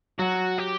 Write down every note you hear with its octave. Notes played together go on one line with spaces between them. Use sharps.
F#3 F#4
G4